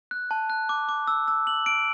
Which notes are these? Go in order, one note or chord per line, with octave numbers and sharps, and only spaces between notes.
F#6
A5
F#6
D6
D6
E6
E6
F#7
D7